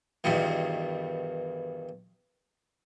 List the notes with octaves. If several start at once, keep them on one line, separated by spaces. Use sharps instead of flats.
E2 G2 B2 D#3